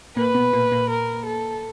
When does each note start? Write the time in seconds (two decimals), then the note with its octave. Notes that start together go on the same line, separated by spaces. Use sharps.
0.16 A#2 A#3 B4
0.34 B2 B3
0.53 A#2 A#3
0.72 A#2 A#3
0.90 A#4
1.26 A4